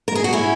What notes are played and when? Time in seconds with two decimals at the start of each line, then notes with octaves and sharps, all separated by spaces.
0.08 A#4
0.15 G#4
0.24 F#4
0.33 C#4 E4